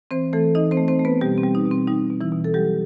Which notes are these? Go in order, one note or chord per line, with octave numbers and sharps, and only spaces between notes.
E3 C4 C5
E3 A3 A4
E3 D#4 D#5
C4 C5
A3
C4 C5
A3
B3 B4
B2 G3 G4
C4
G3
D#4
B2
C4
G3 D#4
B2
E3 E4
B2
A4
F#3 G3 G4